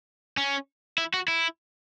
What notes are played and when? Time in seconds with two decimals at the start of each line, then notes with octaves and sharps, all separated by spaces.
0.37 C#4
0.98 E4
1.14 F#4
1.28 E4